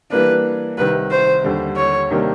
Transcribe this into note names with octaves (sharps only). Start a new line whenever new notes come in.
E3 G3 A#3 D4 B4
C2 C3 D#3 B4
C5
D#2 D3 G3
C#5
C3 D#3 G3 A#3 D4